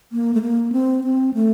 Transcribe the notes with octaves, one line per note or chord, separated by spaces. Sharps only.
A#3
A3
A#3
C4
C4
A3